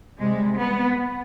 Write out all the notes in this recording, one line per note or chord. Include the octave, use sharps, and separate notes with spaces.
C3 G3 G#3
B3